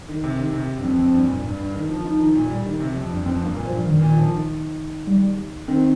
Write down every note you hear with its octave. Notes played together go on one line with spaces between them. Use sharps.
D#3
C3
D#3
C3
G2
F2 C4
F2
G2
A#2
G2
G2
G2
D#3
F3
F3 D#4
D#3
A#2
G3
D#3
C3
F2
G2
F2 C4
G2 A#3
A#2
F3
G2
G2 D#3
A#2
F3
D#3
G3
D#3 C4